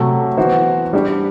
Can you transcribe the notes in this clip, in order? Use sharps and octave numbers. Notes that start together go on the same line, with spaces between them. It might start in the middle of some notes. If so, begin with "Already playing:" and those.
Already playing: C3 F#3 A3
E3 B3 F#4 C5
G3 D4 G4